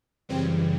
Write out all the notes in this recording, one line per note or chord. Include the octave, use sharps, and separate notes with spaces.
F#2 C#3 E3 G3 C4